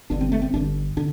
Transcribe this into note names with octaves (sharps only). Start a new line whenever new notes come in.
G1 G2 D3 D4
C4
A3
C4
G1 G2 D3 D4
D3 D4